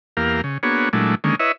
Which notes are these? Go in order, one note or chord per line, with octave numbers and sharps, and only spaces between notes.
E2 A#3 G4 A#4 F5
C#3
A#3 B3 D4 F#4 G#4 C#5
A#2 F#3 G#3 A3 D4 E4
D3 D#3 G#3 A#3 C#4
E4 B4 C#5 D#5 E5